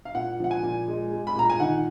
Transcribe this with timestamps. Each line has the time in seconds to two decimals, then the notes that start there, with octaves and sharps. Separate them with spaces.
0.05 F5
0.15 A#2 F#5
0.40 F3 F#5
0.51 G#5
0.63 A#2
0.88 G#3
1.12 G#3
1.27 B5
1.35 A#2 A#5
1.50 G#5
1.60 D#3 F#5